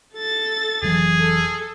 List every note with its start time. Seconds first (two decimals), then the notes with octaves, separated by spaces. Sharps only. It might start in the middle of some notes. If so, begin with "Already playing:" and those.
0.14 A4 A6
0.82 F1 E3 F#3 G#4
1.21 A4